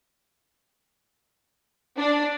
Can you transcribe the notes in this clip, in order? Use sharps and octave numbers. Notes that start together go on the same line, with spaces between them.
D4